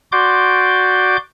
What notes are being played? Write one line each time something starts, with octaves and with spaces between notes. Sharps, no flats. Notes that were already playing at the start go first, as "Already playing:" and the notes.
F#4 D5 C6 D6 G6